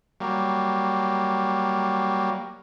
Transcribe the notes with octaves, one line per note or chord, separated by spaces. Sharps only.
F#3 G3 A#3